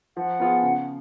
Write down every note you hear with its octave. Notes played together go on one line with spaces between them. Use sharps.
F3 F#5
B3 F4 G#4
C#3